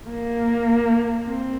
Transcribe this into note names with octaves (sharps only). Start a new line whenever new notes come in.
A#3
C4